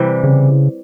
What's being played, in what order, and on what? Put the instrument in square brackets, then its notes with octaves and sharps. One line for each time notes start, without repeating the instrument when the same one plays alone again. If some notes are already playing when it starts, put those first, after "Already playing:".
Already playing: [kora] C3 E3 G3
[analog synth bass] C#3